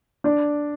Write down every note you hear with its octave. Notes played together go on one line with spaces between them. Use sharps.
D4 D5